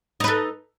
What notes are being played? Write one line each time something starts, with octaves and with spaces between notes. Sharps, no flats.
D#4 A4 B4